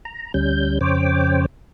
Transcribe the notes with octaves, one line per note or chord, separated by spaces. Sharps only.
A#5
D2 G3 C#4 G6
F2 C#3 C5 C#5 G5 D6